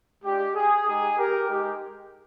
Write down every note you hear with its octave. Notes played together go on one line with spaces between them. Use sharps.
G#3 D4 F4 G4
G#4
G#3 D#4 G4 G#4
G4 A#4
G#3 D#4 G4